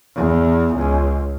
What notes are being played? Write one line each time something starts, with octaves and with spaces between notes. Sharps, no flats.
E2
C#2